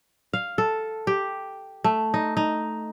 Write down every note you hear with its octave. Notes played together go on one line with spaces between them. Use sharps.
F5
A4
G4
A3
D#4
D#4